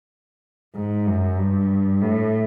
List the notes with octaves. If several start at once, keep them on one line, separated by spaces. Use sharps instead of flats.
G#2
F#2
G2
A2